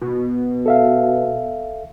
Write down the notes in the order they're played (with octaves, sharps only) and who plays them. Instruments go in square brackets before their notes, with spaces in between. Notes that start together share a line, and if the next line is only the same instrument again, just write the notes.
[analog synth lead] B2
[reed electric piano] A4 E5 F5